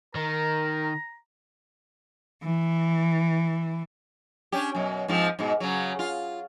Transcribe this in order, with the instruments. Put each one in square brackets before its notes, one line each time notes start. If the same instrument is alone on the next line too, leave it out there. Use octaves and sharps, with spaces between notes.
[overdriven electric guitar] D#3 [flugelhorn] A#4 [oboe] A#5
[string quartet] E3
[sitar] C#4 D4 G4
F#2 B2
G#2 F3 C4
G#2 B2
C#3 F#3
F4